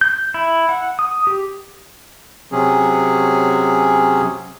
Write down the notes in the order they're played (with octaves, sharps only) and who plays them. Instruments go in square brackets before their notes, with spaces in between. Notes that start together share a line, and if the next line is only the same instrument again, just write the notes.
[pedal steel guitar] G6
E4
F#5
D#6
G4
[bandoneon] C3 F#3 C#4 G#4